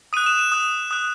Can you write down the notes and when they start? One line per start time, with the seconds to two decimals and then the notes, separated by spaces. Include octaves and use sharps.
0.13 D#6 F#6 D#7
0.26 E7
0.39 D#7
0.52 D#6 F#6
0.91 D#6 F#6